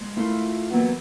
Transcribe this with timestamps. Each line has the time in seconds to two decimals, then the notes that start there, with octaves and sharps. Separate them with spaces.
0.01 G#3
0.16 A3 E4 F4 A4 A#4
0.70 E3 F#3 A#3 B3 F#4